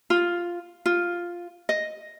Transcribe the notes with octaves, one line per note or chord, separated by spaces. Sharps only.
F4
F4
D#5